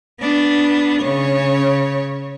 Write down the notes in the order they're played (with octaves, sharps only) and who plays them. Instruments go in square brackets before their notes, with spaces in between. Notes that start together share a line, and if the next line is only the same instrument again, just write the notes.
[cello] B3 D4
C#3 C#5